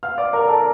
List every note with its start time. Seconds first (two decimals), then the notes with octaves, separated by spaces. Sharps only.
0.03 F5 F6
0.18 D5 D6
0.33 A#4 A#5
0.48 A4 A5